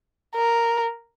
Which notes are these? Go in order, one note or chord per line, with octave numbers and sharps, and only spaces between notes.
A#4